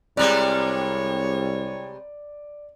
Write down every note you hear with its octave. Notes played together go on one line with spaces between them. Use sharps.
C2 C3 G3 G#3 C#5 D5